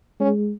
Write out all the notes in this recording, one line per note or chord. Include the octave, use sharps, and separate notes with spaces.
G#3 C#4